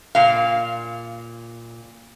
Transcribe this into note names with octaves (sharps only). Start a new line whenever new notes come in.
A#2 F5